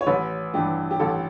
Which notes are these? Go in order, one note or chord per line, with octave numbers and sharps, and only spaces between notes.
C#5
A1 B4
G2 E3 G3 G4
G4
A1 A4